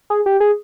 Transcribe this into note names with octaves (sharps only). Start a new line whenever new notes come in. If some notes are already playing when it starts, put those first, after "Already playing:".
G#4
G4
G#4